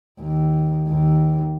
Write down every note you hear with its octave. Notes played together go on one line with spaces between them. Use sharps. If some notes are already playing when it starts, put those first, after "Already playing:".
D#2
D#2